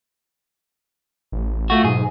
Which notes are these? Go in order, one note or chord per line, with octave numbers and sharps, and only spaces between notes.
A1
A3 F4 F#4
B1 G#2 G#4